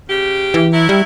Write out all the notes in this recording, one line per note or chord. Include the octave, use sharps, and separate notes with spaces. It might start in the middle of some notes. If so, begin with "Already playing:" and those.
C#3 G4
E3
F#3 E4
G3